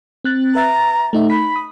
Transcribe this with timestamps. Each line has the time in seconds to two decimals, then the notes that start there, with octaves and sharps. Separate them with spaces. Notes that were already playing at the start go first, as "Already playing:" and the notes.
0.24 C4 F#6 A6
0.55 B4 E5 A#5 A6
1.13 A3 D#4 E5
1.30 B5 B6
1.56 D#6